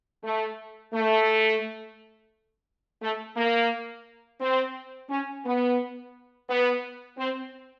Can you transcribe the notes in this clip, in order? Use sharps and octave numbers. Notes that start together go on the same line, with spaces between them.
A3
A3
A3
A#3
C4
C#4
B3
B3
C4